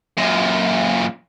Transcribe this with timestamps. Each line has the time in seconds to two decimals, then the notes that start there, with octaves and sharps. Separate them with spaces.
0.17 F#2 A#2